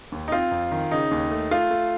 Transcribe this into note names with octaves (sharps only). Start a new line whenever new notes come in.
D#2
D#4
C4 F4
F2
D#3
C#3 D#4
D#2
A3
A3 F4
A3